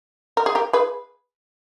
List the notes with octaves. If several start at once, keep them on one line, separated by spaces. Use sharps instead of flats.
A#4
G#4
G4 A#4
G#4 B4